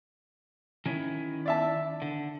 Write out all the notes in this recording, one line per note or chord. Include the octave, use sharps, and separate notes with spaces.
D#3 C#4 E4
D5 E5 A5
D3